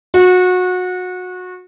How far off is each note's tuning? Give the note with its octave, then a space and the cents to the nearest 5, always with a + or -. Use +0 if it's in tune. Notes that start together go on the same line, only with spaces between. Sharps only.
F#4 -25